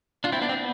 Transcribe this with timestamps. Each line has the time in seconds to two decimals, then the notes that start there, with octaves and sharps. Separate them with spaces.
0.24 D4 F4
0.32 C4 E4
0.41 B3 D4
0.49 C4
0.57 B3